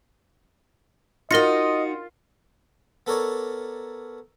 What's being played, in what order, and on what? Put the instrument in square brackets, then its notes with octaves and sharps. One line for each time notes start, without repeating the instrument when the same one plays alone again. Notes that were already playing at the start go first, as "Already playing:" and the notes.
[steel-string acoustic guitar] D#4 F#4 [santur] F4 [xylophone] A#4 A#6 C#7 [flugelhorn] D#5
[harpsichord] B3 A4 A#4 C#5 D5